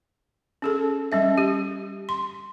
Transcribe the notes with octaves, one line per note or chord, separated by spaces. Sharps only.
C#4 G#4 A4
G3 C#4 E5
G4
C6